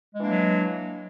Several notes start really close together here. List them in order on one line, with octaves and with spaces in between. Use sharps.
G#3 E3 D4 A#3 F#3